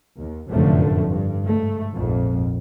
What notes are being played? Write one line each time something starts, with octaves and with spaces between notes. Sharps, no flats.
D#2
F1 F#2 A2 D3 F3 A3
G2
G#2 A3
A#1 F2 G#2